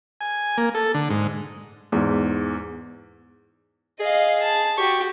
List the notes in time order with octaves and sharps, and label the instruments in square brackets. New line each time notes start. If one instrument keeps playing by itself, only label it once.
[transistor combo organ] G#5
A#3
A4
D3
G#2
[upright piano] E2 G#2
[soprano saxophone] G#4 [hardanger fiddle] D#5 F5
[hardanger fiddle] A5
[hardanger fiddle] F#4 G4 [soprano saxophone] C#6